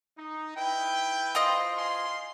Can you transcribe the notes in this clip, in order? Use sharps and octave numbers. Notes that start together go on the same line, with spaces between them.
D#4
E4 B4 G5
F4 C5 D#5
F5 G#5 C6